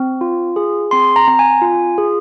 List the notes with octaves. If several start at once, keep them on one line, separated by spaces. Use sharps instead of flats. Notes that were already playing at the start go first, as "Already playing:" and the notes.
Already playing: C4
F4
G#4
C4 C6
A#5
C4 A#5
G#5
F4
G#4